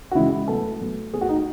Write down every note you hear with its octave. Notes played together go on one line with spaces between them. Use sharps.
F#4
C#3 E3 G#3 E4
B2 F#3 A3 A4
B2 F#3 A3
B2 A3 G#4
F#4
D#4